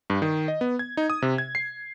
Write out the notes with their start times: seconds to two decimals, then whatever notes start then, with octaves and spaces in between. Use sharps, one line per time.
0.10 G2
0.22 D#3
0.48 D#5
0.61 B3
0.79 G#6
0.97 D#4
1.10 D#6
1.22 C3
1.38 G#6
1.55 C7